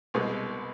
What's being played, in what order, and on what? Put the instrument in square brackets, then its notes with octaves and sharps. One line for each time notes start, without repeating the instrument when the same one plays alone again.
[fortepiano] C2 B2 G#3 B3